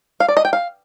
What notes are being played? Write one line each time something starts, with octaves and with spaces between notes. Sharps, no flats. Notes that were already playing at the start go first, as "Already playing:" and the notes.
F5
D5
D#5
G5
F5